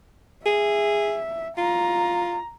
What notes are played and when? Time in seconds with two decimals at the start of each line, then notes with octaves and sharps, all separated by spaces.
0.46 G#4 E5
1.57 F4 A#5